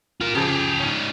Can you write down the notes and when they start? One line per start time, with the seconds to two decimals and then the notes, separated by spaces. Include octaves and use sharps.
0.21 F4 A#4
0.35 C#3 F3 G4 G#4
0.80 C#4 D#4